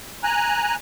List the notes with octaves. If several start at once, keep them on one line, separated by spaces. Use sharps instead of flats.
G#5 A#5 F#6